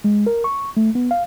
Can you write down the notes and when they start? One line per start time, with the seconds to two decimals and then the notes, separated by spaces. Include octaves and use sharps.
0.04 G#3
0.27 A#4
0.44 C#6
0.77 A3
0.95 B3
1.11 F5